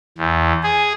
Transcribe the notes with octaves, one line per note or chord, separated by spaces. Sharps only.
E2
G#4